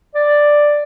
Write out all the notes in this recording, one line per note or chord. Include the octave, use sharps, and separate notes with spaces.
D5